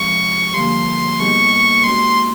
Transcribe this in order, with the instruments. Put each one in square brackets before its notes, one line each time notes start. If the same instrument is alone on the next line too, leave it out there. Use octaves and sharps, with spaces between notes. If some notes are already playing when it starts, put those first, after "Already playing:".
Already playing: [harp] C3 F3 G#3 [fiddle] C#6
[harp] G2 D3 F3 A#3 [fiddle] C6
[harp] B2 G3 A#3 D#4 G#4 [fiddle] C#6
[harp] G#3 C#4 F#4 [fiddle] C6